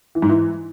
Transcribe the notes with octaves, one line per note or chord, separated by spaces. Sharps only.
E3
G#2
E3